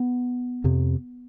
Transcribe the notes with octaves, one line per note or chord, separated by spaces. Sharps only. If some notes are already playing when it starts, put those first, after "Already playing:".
Already playing: B3
F2 C3